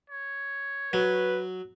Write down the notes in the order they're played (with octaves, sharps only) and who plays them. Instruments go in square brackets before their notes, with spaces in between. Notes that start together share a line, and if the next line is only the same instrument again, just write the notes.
[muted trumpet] C#5
[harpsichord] F#3 [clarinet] B4